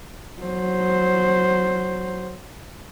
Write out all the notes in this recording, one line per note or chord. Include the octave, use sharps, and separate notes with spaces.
F#3 C5